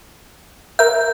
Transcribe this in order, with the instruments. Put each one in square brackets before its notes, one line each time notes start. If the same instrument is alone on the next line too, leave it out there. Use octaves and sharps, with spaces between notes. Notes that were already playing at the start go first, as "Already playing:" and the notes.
[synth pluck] A#4 E5 [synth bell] G6